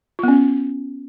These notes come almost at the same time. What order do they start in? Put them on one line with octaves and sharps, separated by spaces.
F4 B3 C#4